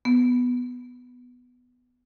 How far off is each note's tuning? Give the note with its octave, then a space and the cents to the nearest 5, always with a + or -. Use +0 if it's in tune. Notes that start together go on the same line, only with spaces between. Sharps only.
B3 +5